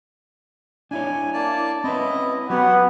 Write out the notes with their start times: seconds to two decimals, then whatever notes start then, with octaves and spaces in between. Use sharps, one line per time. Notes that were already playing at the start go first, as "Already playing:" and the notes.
0.91 D4 E4 C#5 G#5
1.34 A#3 D5 A5
1.84 C4 C#4 E4 B4 D#5
2.50 F#3 B3 F#4 G4 C#5